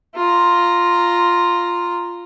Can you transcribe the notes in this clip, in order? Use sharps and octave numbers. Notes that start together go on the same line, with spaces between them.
F4 A#5